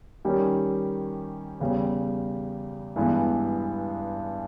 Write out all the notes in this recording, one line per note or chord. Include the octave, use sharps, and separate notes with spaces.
D#3 G3 C#4 G4
E2 C#3 G3
G2 E3 G#3 B3 E4